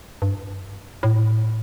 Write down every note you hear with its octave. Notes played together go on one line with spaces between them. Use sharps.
G2
A2